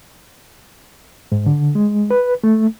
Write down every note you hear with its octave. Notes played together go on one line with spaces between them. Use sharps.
G#2
D3
G#3
B4
A3